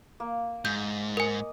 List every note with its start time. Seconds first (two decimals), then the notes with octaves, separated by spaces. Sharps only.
0.20 A#3
0.65 G#2 G6
1.17 A#4 D#5 G#5